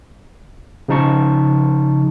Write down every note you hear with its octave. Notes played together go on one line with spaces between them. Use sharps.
C#3 F3 D#4 A5 C#6